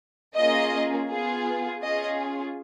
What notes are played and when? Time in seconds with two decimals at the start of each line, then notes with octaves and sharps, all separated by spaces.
0.36 A#3 C#4 F4 G#4 D#5
1.10 B3 F4 G#4
1.82 C#4 F4 G#4 D#5